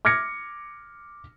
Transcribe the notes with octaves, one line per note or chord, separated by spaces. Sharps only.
D6 F6 G#6 A#6 C#7